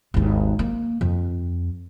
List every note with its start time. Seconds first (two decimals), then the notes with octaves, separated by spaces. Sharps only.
0.14 G#1 D#2
0.59 A#3
1.01 F2